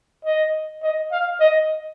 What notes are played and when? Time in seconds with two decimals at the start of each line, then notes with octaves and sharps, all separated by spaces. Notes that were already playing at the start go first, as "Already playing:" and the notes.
0.25 D#5
0.83 D#5
1.12 F5
1.40 D#5